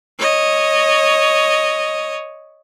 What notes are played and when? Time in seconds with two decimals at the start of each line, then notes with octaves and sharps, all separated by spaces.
0.19 C#5 D#5